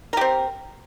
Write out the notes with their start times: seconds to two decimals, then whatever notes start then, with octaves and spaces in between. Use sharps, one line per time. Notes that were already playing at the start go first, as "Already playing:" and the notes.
0.13 A#4
0.17 G4
0.21 C4